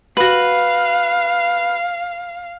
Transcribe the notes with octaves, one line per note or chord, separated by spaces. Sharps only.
F#4 B4 F5